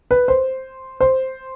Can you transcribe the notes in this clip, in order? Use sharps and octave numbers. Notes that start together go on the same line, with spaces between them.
B4
C5
C5